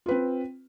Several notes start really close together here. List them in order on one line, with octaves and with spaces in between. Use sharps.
F4 B4 C4